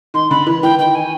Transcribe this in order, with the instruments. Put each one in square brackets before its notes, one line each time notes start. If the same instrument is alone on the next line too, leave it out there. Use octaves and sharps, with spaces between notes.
[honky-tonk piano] D#3 [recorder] C6
[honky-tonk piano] D3 [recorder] B5
[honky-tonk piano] E3
[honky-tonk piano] E3 [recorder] G5
[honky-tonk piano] D#3 [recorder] G5
[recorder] G#5